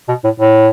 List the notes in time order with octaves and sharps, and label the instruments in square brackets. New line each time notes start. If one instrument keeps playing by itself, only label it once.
[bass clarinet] B2
A2
A2